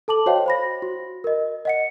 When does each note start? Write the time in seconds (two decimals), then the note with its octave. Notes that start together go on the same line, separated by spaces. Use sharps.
0.08 A4 A5 D6 F#7
0.26 F#4 C5 C#5 D#5 F5 G5
0.46 C5 B5 A#6
0.82 F#4
1.24 A#4 D#5
1.65 D#5 F#5 C#7